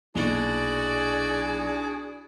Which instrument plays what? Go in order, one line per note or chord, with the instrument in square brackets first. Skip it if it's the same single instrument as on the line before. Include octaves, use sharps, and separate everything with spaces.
[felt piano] B1 A#2 [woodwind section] D4 E4 [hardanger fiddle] F#4 D5 [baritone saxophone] G#4